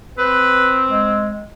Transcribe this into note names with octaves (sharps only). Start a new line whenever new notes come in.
C4 B4
G#3